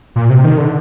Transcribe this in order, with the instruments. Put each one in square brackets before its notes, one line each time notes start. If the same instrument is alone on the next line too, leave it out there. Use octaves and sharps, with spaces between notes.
[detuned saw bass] A#2
C3
D#3
D3